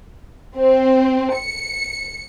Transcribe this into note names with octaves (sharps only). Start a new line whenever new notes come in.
C4
C#7